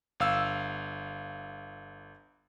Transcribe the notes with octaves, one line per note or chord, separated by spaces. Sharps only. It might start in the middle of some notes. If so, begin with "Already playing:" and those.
G1 F5 E6